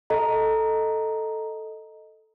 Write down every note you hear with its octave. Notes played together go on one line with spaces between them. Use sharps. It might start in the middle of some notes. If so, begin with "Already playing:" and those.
A4 D#5 A#5